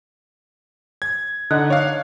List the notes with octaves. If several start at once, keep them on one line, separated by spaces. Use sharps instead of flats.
G#6
D3 D#4 F#5
C#5 D5 F5